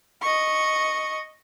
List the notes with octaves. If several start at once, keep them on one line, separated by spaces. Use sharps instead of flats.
D#5 C#6